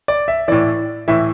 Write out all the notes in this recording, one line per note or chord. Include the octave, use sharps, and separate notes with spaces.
D5
E5
A2 E3 D5
A2 E3 E5